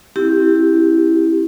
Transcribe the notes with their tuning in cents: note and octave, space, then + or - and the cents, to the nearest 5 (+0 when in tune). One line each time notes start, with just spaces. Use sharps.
C4 +35 E4 -5 G4 +0